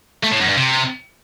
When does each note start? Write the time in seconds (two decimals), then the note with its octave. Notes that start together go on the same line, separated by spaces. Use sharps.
0.24 A3
0.32 A2
0.40 F#2
0.49 G2
0.57 C3